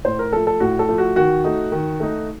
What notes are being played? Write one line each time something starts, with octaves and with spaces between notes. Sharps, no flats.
A2 C5
A#4
F3 A3 A4
A4
A2 F#4
A4
F3 A3
F#4
D#3 F#4
A3 D#4
D#3
A3 D#4